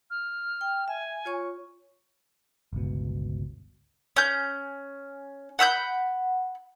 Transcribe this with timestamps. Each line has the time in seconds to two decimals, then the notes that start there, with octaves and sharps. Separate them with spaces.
0.10 F6
0.61 G5
0.88 E5 G#5
1.25 F4 C#5 C#6
2.73 G1 C#2 B2
4.16 C#4 G6
5.59 F#5 B5 E6 G6